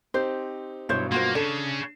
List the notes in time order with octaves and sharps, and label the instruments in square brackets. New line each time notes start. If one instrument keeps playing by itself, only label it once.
[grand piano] C4 D#4 G4 [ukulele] C5
[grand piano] G2 B2 F#3 [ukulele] E4 C5 C#5
[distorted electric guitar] A#3 [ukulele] F4 F#4 C5
[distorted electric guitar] C#3 C#4 [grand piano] D4 E7 [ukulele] A4